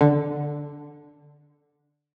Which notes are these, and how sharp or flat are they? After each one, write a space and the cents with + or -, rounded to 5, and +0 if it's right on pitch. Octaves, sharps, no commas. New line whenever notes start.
D3 +0